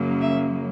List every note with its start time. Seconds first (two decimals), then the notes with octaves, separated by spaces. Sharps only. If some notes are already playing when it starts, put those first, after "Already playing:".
Already playing: F#2 C#3 F#3 A#3
0.21 E5